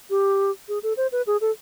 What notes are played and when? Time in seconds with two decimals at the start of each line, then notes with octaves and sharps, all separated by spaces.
0.10 G4
0.68 G#4
0.83 A4
0.97 C5
1.12 B4
1.27 G#4
1.41 A4